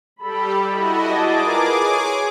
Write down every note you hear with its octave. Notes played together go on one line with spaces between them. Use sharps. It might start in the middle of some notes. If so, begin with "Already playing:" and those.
G3 G4 A4 B5
E4 F#4 D#5
G#4 D5 D#5 A5 D6
F4 A#4 B4
C#5